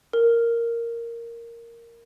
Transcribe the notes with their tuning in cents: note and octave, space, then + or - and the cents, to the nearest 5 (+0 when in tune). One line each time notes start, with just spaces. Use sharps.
A#4 -5